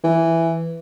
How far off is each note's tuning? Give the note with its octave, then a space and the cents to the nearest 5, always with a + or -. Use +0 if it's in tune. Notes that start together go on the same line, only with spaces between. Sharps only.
E3 +5